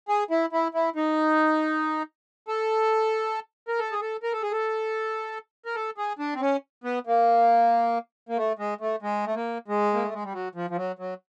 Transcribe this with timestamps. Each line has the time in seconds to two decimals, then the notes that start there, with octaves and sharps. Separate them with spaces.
0.08 G#4
0.31 E4
0.53 E4
0.74 E4
0.96 D#4
2.48 A4
3.68 A#4
3.79 A4
3.92 G#4
4.01 A4
4.23 A#4
4.33 A4
4.43 G#4
4.52 A4
5.66 A#4
5.75 A4
5.98 G#4
6.19 D4
6.35 C4
6.41 C#4
6.84 B3
7.07 A#3
8.29 A#3
8.37 A3
8.59 G#3
8.81 A3
9.02 G#3
9.26 A3
9.35 A#3
9.68 G#3
9.94 A#3
10.04 A3
10.14 G#3
10.24 G3
10.33 F#3
10.55 F3
10.70 F3
10.77 F#3
10.99 F#3